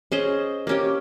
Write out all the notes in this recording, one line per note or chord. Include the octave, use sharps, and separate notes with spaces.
C#4 G#4 C5 D#5
A#3 C#4 G4